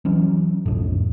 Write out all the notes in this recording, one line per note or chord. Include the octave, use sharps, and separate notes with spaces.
E3 F#3 C#4
B1 F2 A2